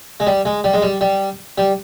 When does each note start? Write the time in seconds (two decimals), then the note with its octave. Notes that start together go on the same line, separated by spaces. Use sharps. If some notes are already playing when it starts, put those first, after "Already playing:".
0.20 G#3
0.27 G3
0.45 G#3
0.64 G3
0.74 G#3
0.82 G3
1.01 G3
1.58 G3